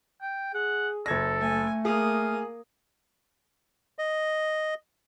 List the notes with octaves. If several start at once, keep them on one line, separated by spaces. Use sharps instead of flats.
G5
G#4 F#5
F#1 A4 G#6 A#6
A3 G#5
A#3 G#4 F5 D#6
D#5